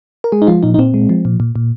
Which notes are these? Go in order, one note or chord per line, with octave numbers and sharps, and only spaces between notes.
A#4
G#3 G#4
D#4
F3 F4
A#2 D#4
D#4
A#2 C4
G#3
F3
A#2
A#2
A#2